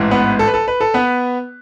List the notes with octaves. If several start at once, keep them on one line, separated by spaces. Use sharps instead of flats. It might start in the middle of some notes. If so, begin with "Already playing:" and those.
Already playing: A1 G#2 E3
B3 B4
A4
B4
A4
B4
A4
B3 B4